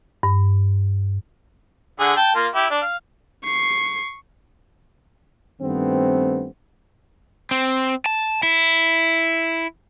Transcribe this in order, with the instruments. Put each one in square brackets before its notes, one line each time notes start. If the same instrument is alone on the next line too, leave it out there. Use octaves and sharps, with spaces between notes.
[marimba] G2
[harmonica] D3 G#4 F#5
G5 A5
A#3 F4
E4 G4
D4
F5
[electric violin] C#6 C7
[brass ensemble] G2 D#3 A3 B3 C4
[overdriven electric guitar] C4
A5
E4